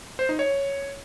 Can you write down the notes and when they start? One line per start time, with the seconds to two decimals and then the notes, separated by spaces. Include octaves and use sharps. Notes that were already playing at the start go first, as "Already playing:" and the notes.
0.19 C5
0.29 D#4
0.39 C#5